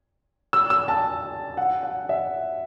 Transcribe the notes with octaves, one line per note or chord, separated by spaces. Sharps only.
E6
E6
A5
F#5
F#5
E5